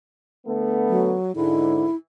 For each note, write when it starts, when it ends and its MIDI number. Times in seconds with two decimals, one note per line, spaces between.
0.46 1.15 50
0.46 1.15 57
0.46 1.15 59
0.89 1.35 54
1.36 1.86 44
1.36 1.86 50
1.36 1.95 64